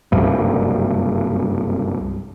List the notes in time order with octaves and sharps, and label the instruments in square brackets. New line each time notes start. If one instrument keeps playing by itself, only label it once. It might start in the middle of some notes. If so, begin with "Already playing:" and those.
[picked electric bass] F#1 C2 G2